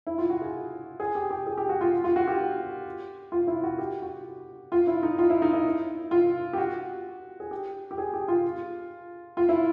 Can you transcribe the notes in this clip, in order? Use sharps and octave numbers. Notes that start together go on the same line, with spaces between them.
E4
F4
F#4
G#4
G#4
G4
G4
G#4
G4
F#4
F4
F4
F#4
G4
F4
E4
F#4
G4
F#4
F4
E4
D#4
F4
E4
D#4
E4
F4
G4
F#4
G#4
G4
G4
G#4
G4
F4
F4
E4